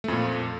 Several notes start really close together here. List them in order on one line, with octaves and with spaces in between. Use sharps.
A3 F2 A#2